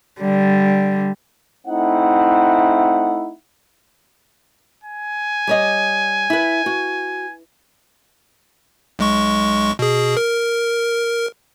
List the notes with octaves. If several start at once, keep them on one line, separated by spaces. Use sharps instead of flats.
D3 G3
A3 C4 D#4 E4 F#5
G#5
G3 C#5 D#5
E4 B4
F#4
B1 G#3 C#6
B2 G#4
A#4